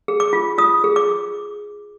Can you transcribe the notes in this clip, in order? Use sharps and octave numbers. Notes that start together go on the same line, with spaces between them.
G#4
D6
F4
F4 D#6
G#4
D6